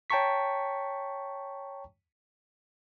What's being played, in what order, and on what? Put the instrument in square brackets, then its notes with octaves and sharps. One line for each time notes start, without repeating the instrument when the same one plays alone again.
[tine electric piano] C#5 G5 A5 A#5 C#6 B6